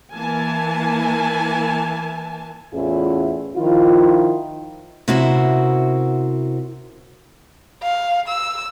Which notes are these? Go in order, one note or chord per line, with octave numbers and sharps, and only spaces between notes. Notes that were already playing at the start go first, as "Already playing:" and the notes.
E3 A#3 G#5 A5
E2 A2 C#4 E4 F4 G#4
D#3 F3 E4 F4
C3 C#4 E4 F#4 A#4 C5
F5
E6